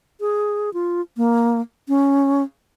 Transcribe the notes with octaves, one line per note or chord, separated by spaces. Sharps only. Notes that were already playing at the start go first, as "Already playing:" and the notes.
G#4
F4
A#3
C#4